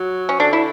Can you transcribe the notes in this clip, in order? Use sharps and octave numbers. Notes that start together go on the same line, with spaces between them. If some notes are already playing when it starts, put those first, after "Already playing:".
Already playing: F#3
C#4
D3 D4
E4